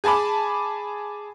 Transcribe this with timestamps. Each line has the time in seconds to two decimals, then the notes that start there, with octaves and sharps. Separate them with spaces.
0.04 G#4 G#5 A5 B5 D6